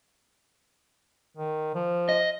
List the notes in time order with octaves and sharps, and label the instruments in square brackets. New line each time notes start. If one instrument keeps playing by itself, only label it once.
[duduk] D#3
F3
[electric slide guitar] D#5